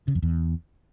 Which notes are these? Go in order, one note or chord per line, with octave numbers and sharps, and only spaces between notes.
C#3
F2
E2